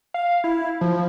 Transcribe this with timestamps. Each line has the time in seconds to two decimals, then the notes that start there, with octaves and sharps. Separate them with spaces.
0.14 F5
0.44 E4
0.81 F3